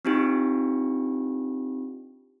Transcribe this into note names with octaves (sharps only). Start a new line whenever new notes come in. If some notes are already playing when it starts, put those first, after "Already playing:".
C4 D4 D#4 F4 G4